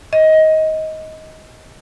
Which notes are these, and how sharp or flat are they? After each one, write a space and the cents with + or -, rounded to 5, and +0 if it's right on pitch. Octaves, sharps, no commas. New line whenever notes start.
D#5 +15